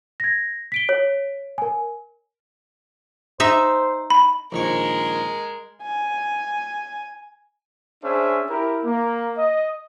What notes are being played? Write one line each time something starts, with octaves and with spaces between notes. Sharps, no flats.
G#6 A#6
B6 D7 G7
C#5
A#4 G#5
D#4 C5 E5
B5
A#1 D#3 G#3 A#4 C#5
G#5
C#4 D4 G#4 C5 E5
E4 G4 A#4
A#3
D#5